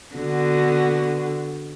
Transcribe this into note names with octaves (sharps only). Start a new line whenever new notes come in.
D3 B3 F#4